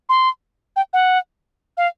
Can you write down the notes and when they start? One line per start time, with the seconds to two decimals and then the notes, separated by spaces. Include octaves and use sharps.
0.09 C6
0.76 G5
0.93 F#5
1.77 F5